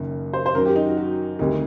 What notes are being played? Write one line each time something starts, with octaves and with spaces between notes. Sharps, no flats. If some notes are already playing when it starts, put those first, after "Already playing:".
Already playing: F#1 F#2 D#3
C5
C5
F#2 D#3 F#3 A#4
G4
D#4
F#4
F#4
D2 C3 D#3 G3 D#4